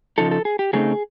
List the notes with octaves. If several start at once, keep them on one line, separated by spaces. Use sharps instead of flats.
C#3 F3 D#4 A4
A4
G#4
G4
C#3 F#3 A3 C4 D#4 G#4